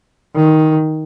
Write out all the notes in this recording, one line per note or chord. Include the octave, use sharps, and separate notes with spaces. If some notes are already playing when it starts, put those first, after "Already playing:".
D#3